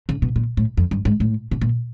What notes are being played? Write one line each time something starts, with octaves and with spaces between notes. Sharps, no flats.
C#3
B2
A#2
A2
F2
G2
G#2
A2
B2
A#2